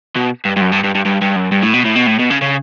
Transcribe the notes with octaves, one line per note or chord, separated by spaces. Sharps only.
B2
G2
G2
F#2
G2
G2
G2
G2
G2
F#2
G2
A2
B2
A2
B2
A2
B2
C#3
C#3